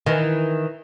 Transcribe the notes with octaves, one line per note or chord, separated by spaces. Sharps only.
D#3 E3